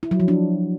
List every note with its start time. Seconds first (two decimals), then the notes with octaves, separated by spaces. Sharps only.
0.03 E4
0.11 F#3
0.20 F3
0.28 D4